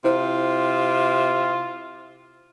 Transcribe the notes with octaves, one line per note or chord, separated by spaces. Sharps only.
C3 E4 F4 C5